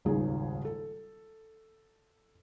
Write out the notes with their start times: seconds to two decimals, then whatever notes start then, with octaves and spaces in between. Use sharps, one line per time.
0.05 D#1 G#1 C#2 D#3 G#4
0.65 A4